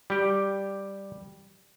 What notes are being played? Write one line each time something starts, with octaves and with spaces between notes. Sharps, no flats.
G3 G4